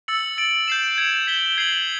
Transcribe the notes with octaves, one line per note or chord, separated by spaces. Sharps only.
E6 A6 C#7 F#7
A6 D7 F#7
G6 C7 E7
G#6 C#7 F7
G#6 B6 E7 G7
G#6 C7 D#7 F#7